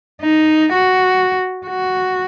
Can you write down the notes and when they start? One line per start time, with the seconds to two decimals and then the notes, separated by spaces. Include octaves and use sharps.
0.22 D#4
0.73 F#4
1.66 F#4